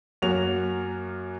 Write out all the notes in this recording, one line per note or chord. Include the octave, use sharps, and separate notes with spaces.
F#2 A#3 F#4 C#5 F7